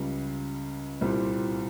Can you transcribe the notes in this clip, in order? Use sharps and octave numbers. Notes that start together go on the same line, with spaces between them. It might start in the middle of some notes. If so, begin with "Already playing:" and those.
Already playing: C#2 C#3 G3
C2 A#2 G3 C4